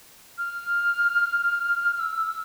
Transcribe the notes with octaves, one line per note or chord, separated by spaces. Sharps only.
F6
E6